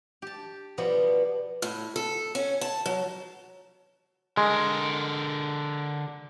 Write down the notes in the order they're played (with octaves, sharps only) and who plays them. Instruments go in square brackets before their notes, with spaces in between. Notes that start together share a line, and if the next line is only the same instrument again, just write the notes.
[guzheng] G4 A5
B2 F3 G3 B3
[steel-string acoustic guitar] A2
A4
C#4
A5
F#3
[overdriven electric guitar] D3 A#4 [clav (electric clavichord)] G#3